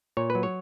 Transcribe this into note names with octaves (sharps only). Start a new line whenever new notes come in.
A#2 C#5
B4
F#3
C#5